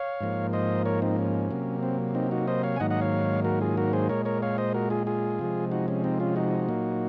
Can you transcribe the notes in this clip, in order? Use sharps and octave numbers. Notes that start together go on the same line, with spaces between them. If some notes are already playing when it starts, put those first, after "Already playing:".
Already playing: C#5 F5
G#2 F3 A#3
C5 D#5
A#4 C#5
C4 D#4
C#4
C3 F#3 A#3
C4
C4 D#4
D#4 F#4
C5 D#5
C#5 F5
G#5
G#2 D#3 F#3 A#3 D#5 F#5
D#5 F#5
C#5 F5
F#4 A#4
F4 G#4
F#4 A#4
G#4 C5
A#2 G#3 A#4 C#5
A#4 C#5
C#5 F5
C5 D#5
F#4 A#4
F4 G#4
F4 G#4
C3 F3 G#3
D#4 F#4
C#4
C4 D#4
C#4 F4
D#4 F#4
A#2 F#3 A#3